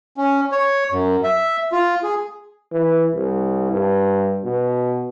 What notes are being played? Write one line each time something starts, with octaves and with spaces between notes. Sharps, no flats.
C#4
C#5
F#2
E5
F4
G#4
E3
C2
G2
B2